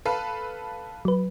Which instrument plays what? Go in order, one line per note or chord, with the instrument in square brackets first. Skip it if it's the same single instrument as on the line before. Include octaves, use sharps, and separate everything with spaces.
[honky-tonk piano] A4 B4 F5
[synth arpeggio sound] F#3 B4